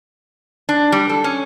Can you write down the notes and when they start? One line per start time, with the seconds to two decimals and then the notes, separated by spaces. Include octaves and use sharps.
0.69 D4
0.92 G3
1.09 A4
1.24 C#4